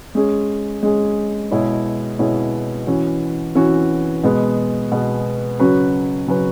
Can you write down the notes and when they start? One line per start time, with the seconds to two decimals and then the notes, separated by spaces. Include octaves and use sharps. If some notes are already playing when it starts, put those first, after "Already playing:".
0.15 G#3 C#4 G#4
0.83 G#3 C#4 G#4
1.51 B2 G#3 E4 G#4 C#5
2.19 B2 G#3 E4 G#4 C#5
2.87 E3 C#4 F#4
3.55 E3 C#4 F#4
4.23 B2 G#3 B3
4.92 B2 G#3 B3
5.60 C#3 F#3 C#4 F#4 B4
6.27 C#3 F#3 C#4 F#4 B4